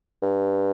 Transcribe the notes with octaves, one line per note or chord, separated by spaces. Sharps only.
G2